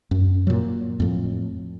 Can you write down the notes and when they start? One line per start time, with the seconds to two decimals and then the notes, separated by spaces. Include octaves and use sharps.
0.11 F#2
0.47 A#2 F#3
1.00 F2 A2